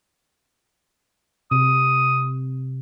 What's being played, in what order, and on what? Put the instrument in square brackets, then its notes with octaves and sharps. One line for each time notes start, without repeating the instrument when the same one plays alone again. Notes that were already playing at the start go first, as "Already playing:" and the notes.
[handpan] C3 [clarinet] D#6